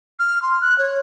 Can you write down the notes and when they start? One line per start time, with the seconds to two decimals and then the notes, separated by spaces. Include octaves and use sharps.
0.19 F6
0.42 C6
0.61 F#6
0.78 C#5